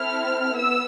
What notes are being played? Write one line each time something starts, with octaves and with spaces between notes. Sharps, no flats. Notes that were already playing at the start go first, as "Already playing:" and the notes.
Already playing: C4 E4 A4 F6
B3 E6